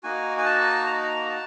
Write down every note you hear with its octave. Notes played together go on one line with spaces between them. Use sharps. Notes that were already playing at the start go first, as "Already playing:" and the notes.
A#3 D#4 F#4 G#5
G#5
A5
A#5
A5